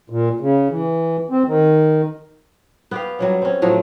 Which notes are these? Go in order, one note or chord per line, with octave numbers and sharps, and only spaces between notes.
A#2
C#3
E3
C4
D#3
B3 G4 F5
F#3 G3 C#4
C4 C#4
A2 F3 F#3 A3